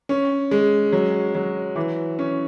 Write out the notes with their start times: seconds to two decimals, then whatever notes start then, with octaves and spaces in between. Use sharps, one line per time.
0.09 C#4
0.51 G#3
0.93 F#3
1.35 F#3
1.76 E3
2.19 C#4